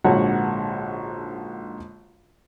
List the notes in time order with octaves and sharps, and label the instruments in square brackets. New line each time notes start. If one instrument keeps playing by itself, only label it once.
[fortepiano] A#1 G#2 D3 F#4 C#5 F#5